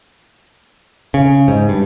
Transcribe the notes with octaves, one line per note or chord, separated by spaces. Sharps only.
C#3
G#2
G2